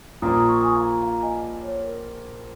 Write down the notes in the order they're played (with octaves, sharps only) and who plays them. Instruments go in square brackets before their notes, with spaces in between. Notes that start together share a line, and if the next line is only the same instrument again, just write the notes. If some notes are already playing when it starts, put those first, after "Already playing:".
[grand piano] A#1 A#2 A#3 [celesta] A#5 D#6
[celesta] C#6
D#6
G#5 C#6
F5 A#5
F5 A#5
D#5 G#5
C#5
A#4